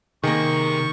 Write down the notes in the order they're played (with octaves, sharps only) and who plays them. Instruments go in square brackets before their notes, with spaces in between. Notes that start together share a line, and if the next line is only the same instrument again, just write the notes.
[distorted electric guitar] C3 [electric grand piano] D#3 [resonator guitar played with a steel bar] A#3 G#4 [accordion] C#6